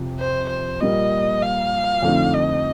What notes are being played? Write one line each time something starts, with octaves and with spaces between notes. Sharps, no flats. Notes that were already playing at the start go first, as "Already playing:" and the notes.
Already playing: F2 C3 F3
C5
C5
A#2 G3 A#3 D#5
F5
F2 D3 A3 C4 D#4
D#5